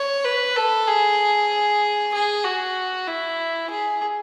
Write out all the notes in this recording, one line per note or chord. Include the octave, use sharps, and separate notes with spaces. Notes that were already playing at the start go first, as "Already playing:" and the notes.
Already playing: C#5
B4
A4
G#4
G#4
F#4
E4
G#4